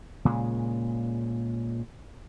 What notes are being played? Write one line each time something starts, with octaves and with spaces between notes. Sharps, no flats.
A#2 C#3 G#3